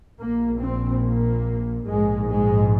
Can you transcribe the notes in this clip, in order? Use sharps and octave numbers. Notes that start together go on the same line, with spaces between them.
A#1 A#2 A#3
C4
A#3
A#1 G#2 G#3
G#3